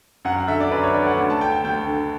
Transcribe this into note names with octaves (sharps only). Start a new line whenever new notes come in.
F#2 F#5
F#5
D3 E5
D5
F#2 B4
C#5
D3 D5
F#5
D2
A5
D3 G5
G5
D2 G5
D3